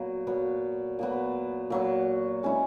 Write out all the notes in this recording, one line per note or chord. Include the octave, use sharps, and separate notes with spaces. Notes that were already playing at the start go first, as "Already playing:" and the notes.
Already playing: A#2 F#3 B3
A#2 F#3 B3
A#2 F#3 B3
A#2 F#3 B3
G#3 C#4 E4